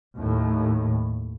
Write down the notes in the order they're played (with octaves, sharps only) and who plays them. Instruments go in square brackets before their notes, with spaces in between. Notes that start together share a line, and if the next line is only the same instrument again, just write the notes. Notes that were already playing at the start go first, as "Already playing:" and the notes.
[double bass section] D#2 A2